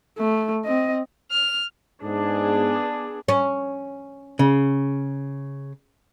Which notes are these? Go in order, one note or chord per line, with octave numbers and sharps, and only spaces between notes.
A3
C4 D#5
F6
G#2 B3 D4 G#4
C#4
C#3